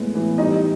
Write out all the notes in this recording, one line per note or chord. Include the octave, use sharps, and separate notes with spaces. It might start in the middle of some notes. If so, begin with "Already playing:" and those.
Already playing: A2 G#3 B3
E3
G3 D#4 D#5